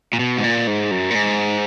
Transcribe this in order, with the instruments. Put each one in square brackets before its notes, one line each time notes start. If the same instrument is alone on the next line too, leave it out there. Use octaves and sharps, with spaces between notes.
[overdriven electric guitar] A#2
B2
G#2
A#2
G#2
F#2
A#2
G#2